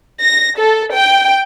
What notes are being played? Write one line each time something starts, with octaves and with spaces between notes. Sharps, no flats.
A#6
A4
G5